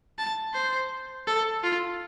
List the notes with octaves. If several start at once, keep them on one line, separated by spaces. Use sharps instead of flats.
A5
C5
A4
F4